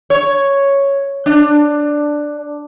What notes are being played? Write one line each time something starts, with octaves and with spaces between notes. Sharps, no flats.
C#5
D4